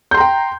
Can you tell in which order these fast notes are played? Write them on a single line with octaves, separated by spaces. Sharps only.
G6 C6 A#5 G5